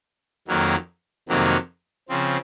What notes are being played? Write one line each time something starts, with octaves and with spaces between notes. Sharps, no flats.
F2 D#3 F#3 A#3
F2 C3 D#3 F#3 A#3
C#3 F3 C4